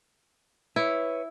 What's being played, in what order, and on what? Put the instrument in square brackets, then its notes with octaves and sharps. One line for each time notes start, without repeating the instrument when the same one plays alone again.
[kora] E4 [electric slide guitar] B4 C#5